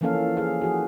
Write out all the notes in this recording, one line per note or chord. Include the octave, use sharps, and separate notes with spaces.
E3 F3 A#3 C#4 A4 F5
G#4 F5
F3 F#4 G#4